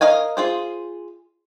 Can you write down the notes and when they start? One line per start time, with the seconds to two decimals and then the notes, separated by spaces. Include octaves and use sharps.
0.01 A#4 D#5 F5 G#5
0.37 F4 G#4 C5